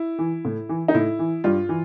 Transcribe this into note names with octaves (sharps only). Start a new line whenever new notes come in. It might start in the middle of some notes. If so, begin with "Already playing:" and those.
Already playing: E4
E3
A2
E3
D#4
A2 E4
E3
G2 F4
E3